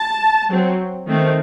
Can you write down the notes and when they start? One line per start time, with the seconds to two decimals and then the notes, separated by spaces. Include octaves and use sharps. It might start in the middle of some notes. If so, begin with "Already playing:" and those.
Already playing: A5
0.49 F#3 C4
1.07 D#3 A3 C4